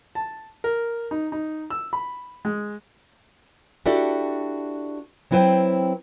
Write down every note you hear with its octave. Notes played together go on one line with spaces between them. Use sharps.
A5
A#4
D#4
D#4
E6
B5
G#3
D4 E4 F#4 G4 A4 D5
F#3 C4 E4 B4 C5 G5